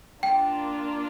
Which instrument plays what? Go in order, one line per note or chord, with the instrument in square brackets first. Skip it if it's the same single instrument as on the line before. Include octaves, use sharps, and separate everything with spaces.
[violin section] A#3 D4 F4 [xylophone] G5